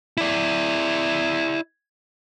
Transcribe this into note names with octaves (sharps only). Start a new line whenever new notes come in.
E4 D5